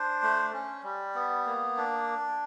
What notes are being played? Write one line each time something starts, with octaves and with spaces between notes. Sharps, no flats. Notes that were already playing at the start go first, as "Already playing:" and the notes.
Already playing: D4 C5
A3
C#4
G3
B3
A#3
D4